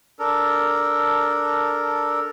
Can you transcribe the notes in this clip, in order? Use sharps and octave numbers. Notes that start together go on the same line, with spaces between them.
D4 A4 A#4